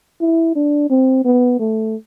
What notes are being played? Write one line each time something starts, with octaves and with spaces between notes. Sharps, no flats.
E4
D4
C4
B3
A3